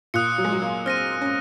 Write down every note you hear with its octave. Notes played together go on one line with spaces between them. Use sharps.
A#2 D#6 F#6 C#7
F#3
G#3
F#3
A#3
C4 F6 A#6 D#7
C#4